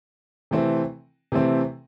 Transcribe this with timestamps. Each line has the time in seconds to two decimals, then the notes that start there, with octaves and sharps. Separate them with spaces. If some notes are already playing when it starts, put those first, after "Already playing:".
0.51 C3 E3 A3 C4
1.32 C3 E3 A3 C4